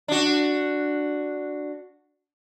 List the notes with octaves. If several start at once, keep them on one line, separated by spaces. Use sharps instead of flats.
D4 F#4